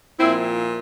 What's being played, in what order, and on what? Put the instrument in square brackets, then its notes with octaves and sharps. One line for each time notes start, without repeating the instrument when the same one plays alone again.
[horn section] A#2 F3 C4 E4